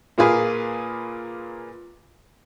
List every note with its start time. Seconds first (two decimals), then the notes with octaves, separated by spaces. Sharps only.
0.18 A#2 A#3 F4 G#4 B4